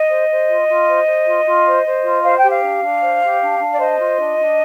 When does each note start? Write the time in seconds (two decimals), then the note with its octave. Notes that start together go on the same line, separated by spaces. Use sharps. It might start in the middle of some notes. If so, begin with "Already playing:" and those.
Already playing: D#5
0.09 C5
0.28 C5
0.48 F4
0.67 F4
0.87 C5
1.06 C5
1.26 F4
1.45 F4
1.64 C5
1.84 C5
2.03 F4
2.23 C5 F5
2.36 G5
2.43 G4
2.50 F5
2.62 D4
2.82 D4
3.01 C5
3.21 G4
3.41 D4
3.59 D4
3.72 D5
3.79 C5 D#5
3.98 F4
4.18 D4
4.37 D4